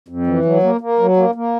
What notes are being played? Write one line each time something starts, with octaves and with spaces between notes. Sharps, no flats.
F2
E3
F#3
A#3
A#3
F#3
A#3
A#3